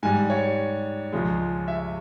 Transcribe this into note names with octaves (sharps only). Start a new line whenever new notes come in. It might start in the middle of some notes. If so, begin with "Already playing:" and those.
G#2 G3 G#5
C#5
C#2 C#3 F3 G#3
E5